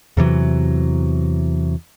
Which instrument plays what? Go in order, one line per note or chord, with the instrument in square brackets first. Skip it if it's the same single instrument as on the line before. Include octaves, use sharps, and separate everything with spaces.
[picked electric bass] E2 C3 E3 F#3